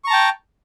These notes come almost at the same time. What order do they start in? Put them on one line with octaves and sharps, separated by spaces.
C#6 A#5 A5 G5